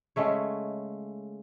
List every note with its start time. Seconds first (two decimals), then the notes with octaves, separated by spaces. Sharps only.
0.16 C#3 G#3 A3 C#5